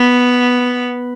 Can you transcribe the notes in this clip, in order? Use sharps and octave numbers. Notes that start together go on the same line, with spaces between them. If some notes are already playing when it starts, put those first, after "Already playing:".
Already playing: B3